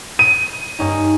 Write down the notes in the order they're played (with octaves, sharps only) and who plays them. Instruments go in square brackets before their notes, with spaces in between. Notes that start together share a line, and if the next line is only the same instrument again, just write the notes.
[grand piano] D#7
[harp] G2 C#4 D#4